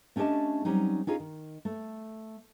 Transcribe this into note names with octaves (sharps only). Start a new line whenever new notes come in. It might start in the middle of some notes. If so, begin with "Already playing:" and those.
A3 C#4 D4 G4 D#5 A5
F#3 G3 C4 C#4 D#4
C#4 D#4 F4 G#4
D#3
A3